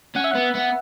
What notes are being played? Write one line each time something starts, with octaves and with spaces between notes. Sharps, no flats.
C#4 F#5
E5
B3 F#5
B3